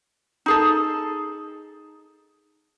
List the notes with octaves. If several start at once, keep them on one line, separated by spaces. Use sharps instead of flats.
D#4 G#4 A4